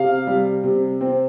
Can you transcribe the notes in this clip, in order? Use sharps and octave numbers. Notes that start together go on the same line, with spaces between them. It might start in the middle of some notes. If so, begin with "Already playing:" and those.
Already playing: C3 F5
G3
C3
C4